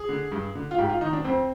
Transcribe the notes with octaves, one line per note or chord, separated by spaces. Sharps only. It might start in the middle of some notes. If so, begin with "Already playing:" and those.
Already playing: G#4
D3
G2
D3
F4
G#2 G4
F4
D#3 D#4
D4
F2 C4